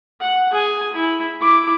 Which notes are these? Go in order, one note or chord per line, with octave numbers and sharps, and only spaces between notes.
F#5
G#4 G#5
E4
E4 D6